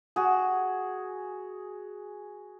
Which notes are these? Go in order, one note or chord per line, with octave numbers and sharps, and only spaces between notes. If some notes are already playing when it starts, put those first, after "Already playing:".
F#4 G#4